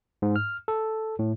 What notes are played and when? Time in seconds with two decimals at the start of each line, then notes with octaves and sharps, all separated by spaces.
0.22 G#2
0.36 F6
0.68 A4
1.19 A2